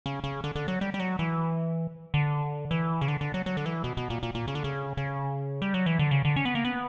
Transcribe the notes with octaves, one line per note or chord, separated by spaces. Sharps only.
C#3
C#3
D3
D3
F#3
G3
G3
F#3
E3
D3
E3
C#3
D3
D3
F#3
F#3
D3
E3
B2
B2
A#2
A#2
A#2
C#3
D3
C#3
C#3
G3
F#3
E3
D3
C#3
D3
C#4
B3
A#3
B3